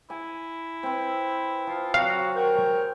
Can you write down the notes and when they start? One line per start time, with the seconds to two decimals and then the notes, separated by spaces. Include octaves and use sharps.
0.10 E4 G#5
0.83 C4 B4
1.67 F3 F4
1.94 F#3 C4 F#4 F5
2.35 F#4 A#4 G5
2.55 G#4 C#5